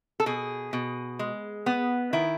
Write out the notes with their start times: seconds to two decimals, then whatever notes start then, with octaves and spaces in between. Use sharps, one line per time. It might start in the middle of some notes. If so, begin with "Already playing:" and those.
0.20 A4
0.26 B2 G#4
0.73 B2
1.19 G#3
1.66 B3
2.13 D#3 E4